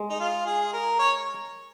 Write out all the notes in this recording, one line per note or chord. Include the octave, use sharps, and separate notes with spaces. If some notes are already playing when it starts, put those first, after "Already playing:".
Already playing: G#3
D#4
F4
G#4
A#4
C#5